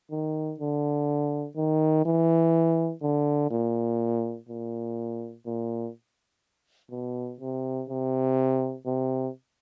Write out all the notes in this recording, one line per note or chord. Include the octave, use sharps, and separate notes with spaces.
D#3
D3
D#3
E3
D3
A#2
A#2
A#2
B2
C3
C3
C3